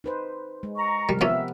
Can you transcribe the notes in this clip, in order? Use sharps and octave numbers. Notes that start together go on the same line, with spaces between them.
D#4 B4 C5
G#3
A#5 C#6
C3 F3 G3 A#4
F3 A#3 B3 C#4 G4 E5